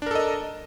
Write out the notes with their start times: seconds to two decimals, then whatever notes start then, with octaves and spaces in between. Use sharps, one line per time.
0.02 D4
0.06 A#4
0.11 A4
0.15 D#5